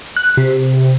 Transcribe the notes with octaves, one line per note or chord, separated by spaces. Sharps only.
F#6
C3